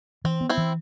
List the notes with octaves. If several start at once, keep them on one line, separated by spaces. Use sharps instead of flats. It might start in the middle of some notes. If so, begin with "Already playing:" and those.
E3 C4
B3
C4 E4
E3